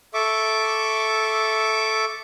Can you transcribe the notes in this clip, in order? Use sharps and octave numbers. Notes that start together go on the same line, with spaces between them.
A4 E5 C#6 D6